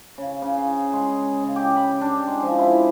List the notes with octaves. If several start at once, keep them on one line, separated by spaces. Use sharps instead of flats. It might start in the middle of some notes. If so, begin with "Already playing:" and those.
C#3
C#3
G#4
G#3
C#3
G4
B5
D4
G#3
F3
E4